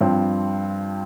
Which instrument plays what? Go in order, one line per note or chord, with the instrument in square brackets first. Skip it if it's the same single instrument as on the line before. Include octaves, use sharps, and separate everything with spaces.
[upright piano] G2 F3 C4